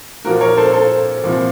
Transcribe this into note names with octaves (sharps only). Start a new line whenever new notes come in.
A#2 F3 A#3 F#4 A#4
A#4 C#5
A4 C5
A4 C5
C2 A#2 F3